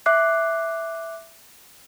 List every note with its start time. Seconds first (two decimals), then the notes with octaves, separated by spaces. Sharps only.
0.06 E5 D6 F#6 C7